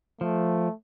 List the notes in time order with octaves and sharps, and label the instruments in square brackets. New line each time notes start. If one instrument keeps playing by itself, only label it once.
[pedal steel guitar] F3 [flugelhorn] A3